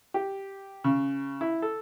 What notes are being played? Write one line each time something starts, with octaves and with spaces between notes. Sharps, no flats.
G4
C#3
E4
A4